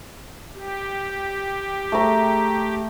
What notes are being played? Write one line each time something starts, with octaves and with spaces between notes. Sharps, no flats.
G4
A3 A#5